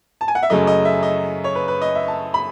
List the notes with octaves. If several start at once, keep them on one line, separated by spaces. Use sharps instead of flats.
A5
G#5
F#5
E5
F#2 C#3 F#3 A3 D#5
D#5
E5
D#5
C#5
B4
B4
D#5
E5
A5
B5